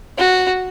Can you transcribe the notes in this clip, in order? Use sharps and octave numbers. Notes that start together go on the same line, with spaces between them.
F#4